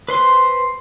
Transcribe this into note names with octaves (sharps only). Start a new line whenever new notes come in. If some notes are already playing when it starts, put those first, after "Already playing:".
B4 C5 C6